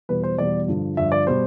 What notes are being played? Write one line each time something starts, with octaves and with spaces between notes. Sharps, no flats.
E2 B2 G3 B4
C5
E2 B2 G3 D5
G2 D3 F3
G2 D3 F3 E5
D5
B2 G3 C5